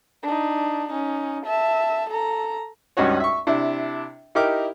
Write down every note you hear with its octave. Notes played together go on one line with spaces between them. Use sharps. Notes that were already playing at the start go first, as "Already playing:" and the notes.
D4 D#4
C#4 D#4
E5 A5
A4 A#5
C#2 G2 C#4 D#4 F#4 C#5
E5 C#6
C3 D4 E4
D#4 E4 G4 A#4 D6